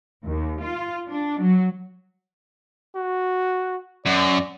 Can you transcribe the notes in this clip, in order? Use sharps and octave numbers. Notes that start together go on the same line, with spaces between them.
D#2
F4
D4
F#3
F#4
F#2 D5